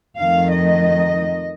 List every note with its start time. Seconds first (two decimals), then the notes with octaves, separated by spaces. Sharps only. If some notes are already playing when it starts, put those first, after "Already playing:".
0.18 F2 D#3 A3 F5
0.51 D#5